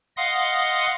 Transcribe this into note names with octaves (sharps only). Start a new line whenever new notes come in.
D#5 F5 F#5 C6 D#6